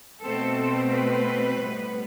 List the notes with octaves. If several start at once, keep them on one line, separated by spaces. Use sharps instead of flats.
B2 A3 C4 A4
B4
A2 G3 B3